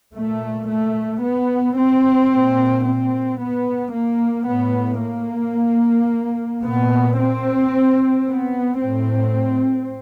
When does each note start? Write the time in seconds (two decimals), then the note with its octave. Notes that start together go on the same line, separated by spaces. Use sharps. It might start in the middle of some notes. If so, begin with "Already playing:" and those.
0.15 A#2 A3
0.69 A3
1.23 B3
1.77 C4
2.32 A#2
2.85 C4
3.39 B3
3.93 A#3
4.47 A2 B3
5.02 A#3
6.64 A#2 B3
7.18 C4
8.26 B3
8.80 A2 C4